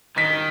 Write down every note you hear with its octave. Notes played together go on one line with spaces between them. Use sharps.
D#3 B6